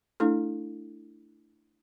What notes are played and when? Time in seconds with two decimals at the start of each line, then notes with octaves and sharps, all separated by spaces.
0.20 A3 D4 E4 A4